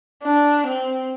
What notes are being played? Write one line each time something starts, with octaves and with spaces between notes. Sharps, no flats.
D4
C4